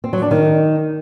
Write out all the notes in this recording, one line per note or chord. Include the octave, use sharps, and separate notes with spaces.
C4
F#3
D4
D#3